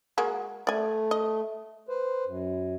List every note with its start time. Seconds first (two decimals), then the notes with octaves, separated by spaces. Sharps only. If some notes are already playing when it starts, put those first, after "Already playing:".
0.18 G#3 A#3 F#4
0.67 A3 D5 G#5
1.11 D#5
1.89 B4 C5
2.25 F#2